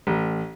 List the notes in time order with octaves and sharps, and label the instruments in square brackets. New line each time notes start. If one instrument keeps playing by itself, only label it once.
[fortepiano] A1